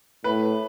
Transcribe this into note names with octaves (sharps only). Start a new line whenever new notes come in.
A2 B4